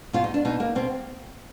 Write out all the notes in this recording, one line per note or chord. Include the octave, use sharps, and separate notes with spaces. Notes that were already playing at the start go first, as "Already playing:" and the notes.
B2 F4
D#4
D4
B2 D#4
A#3
B2 C4